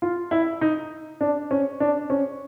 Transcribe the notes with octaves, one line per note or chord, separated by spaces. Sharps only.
F4
E4
D#4
D4
C#4
D4
C#4